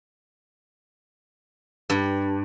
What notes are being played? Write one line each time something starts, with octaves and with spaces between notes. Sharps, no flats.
G2